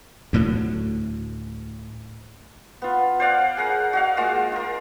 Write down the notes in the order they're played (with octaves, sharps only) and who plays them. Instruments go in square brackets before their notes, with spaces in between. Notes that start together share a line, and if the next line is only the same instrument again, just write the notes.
[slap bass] D2 A2 F#3
[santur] B3 F4
C5 D5 F5 F#5
G#4 A#4 F#5
F#4 D#5 F5
G#3 A#3 F4
F4 A#4